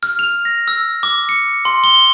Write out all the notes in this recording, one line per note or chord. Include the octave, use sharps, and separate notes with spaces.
F6
F7
A#6
E6
D6
C#7
C6
G7